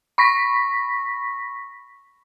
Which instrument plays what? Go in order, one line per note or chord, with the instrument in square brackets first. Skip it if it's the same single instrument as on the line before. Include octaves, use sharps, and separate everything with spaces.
[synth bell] B5 C#6 A#6 B6